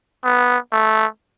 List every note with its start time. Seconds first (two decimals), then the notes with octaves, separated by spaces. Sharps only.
0.24 B3
0.72 A3